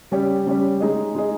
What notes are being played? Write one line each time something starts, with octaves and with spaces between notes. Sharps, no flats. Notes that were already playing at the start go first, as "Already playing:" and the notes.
C#3 G3 C#4 G4 C#5
C#3 G3 C#4 G4 C#5
G#3 D#4 G#4 D#5
G#3 D#4 G#4 D#5